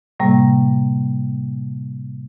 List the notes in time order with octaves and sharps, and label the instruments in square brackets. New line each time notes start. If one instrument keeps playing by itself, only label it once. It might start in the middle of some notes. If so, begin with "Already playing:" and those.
[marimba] A2 C3 G3 A#3